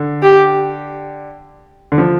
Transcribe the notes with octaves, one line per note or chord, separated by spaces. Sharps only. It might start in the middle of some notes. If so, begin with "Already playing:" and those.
Already playing: D3
G4
D3
F3